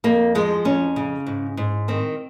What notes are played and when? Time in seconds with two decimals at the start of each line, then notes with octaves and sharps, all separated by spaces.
0.04 F2 A#3
0.35 F3 G#3
0.65 F2 C#4
0.96 C#3
1.26 G#2
1.57 G#2
1.88 D#3 C4